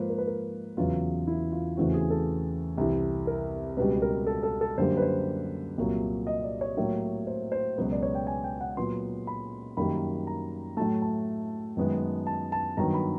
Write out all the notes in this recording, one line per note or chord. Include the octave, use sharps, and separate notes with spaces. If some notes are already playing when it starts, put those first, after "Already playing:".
Already playing: G#2 F3 A#3 B4 C5
A#4
B4
A#4
E2 C#3 F#3 B3 F4
E4
F4
E2 C#3 E3 A3 C4 F#4
G#4
A4
C2 C3 E3
A#4
C#2 B2 G3 B4
A#4
A4
A4
A4
F#2 D3 G3 A#3 C5
B4
C5
C2 A#2 F#3 A#3
D#5
D5
C#5
A2 F#3 A#3
C5
C5
C#2 B2 F#3 B3 B4
D5
C#5
G5
G#5
G5
F#5
A#2 F#3 B3 C6
B5
F#2 D#3 G3 A#3 B5
A#5
A2 F#3 A3 A5
A5
F#2 D#3 G#3 B3
A5
A5
G2 D#3 F#3 B3 A#5
B5